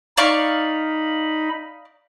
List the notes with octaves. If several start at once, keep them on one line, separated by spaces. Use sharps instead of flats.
D#4 D5 F5 B5 C#6